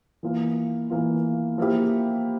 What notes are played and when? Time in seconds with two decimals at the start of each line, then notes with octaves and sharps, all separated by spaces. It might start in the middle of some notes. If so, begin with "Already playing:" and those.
0.23 E3 A#3 F4
0.90 E3 A#3 F4
1.58 F3 A#3 E4 G4